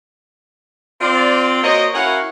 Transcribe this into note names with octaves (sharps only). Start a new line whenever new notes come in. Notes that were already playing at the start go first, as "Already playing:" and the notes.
C4 F4 D5
A#3 F#4 C5 C#5 D#5
C#4 E4 F#4 A#4 F5 F#5